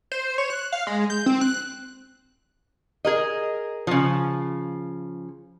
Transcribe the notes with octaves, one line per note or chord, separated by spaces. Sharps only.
C5
C#5
F#6
F5
G#3
G6
C4
F#6
G#4 A#4 D#5
C#3 F3